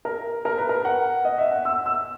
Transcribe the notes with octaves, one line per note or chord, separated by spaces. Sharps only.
A#4
A#4
B4
A#4
F#5
D#5
E5
F#5
E6
E6